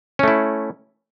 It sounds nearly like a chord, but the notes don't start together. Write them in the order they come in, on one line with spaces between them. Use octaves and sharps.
C#4 A3 E4